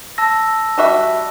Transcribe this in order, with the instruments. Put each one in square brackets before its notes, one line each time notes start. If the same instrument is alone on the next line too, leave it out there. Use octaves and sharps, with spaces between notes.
[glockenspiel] A5 E6 A#6
[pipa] G3 F#4 E5